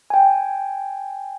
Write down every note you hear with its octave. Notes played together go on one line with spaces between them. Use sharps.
G5 G#5